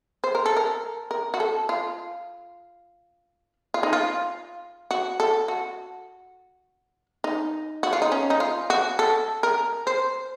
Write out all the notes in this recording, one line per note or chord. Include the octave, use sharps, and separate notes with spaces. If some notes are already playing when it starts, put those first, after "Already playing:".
C5
A#4
A4
A#4
A#4
F#4
A4
F4
F4
D#4
F4
F#4
A4
F#4
D#4
F#4
F4
D#4
C#4
D#4
F4
F#4
A4
A#4
C5